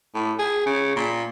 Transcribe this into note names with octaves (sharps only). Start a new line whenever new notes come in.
A2
G#4
C#3
A#2